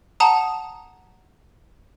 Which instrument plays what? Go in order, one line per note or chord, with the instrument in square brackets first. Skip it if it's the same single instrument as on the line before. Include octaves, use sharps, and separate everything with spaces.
[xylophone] F#5 A5 A#5 D#6